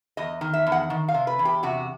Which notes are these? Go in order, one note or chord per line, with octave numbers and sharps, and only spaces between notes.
E2 D#5
D#3
E5
E2
F#5
D#3
F5
C3
B4
E2
G4
C3 F#4